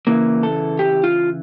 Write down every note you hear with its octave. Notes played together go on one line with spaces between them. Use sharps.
C#3 E3 A#3
A4
G4
F4